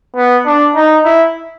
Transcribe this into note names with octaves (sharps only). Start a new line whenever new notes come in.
B3
D4
D#4
E4